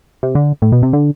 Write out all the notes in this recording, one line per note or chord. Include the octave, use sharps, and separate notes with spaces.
C3
D3
A2
B2
C3
D3